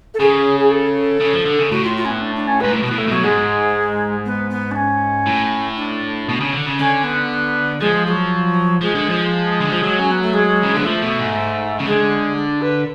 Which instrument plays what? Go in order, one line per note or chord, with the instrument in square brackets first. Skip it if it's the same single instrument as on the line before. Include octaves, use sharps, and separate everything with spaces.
[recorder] A4
[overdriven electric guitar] C#3 [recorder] G#4
[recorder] G#4
A4
[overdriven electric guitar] C#3
F3
D3
C#3
[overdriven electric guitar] A2 [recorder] F#4
[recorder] F4
F4
C#4
B3
D4
D4
C#4
[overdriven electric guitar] G#2 [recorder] B4
[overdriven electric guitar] A2
B2
[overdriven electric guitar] A2 [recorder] B3
[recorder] A3
[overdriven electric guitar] B2 [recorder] F#3
[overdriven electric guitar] G#2 [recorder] G#3
[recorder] B3
B3
D4
C#4
[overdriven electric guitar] A2
[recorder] D4
[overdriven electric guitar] B2
C#3
D3
C#3
[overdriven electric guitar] D3 [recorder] C#4
[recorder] B3
[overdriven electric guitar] F3 [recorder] G#3
[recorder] F#3
[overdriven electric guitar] F3 [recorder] G#3
[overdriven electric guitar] D3
F3
D3
F3
F#3
[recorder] C#4
B3
A3
G#3
[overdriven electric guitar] C#3
[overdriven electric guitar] D3 [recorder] B3
[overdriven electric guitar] F3 [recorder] A3
[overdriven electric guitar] B2
G#2
C#3
[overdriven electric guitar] D3 [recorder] G#3
[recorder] D4
B4